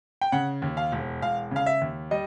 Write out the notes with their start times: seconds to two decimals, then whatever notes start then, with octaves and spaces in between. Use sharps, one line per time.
0.21 G5
0.32 C#3 F#5
0.62 D#2
0.77 F5
0.92 E1
1.22 E1 F5
1.51 C#3 F5
1.66 E5
1.81 D#2
2.11 G3 D#5